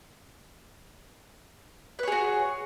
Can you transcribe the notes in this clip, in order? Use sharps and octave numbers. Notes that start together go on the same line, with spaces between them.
F#4 G#4 B4 C#5